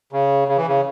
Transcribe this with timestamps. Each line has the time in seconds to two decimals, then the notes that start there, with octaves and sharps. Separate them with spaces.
0.13 C#3
0.48 C#3
0.57 E3
0.67 C#3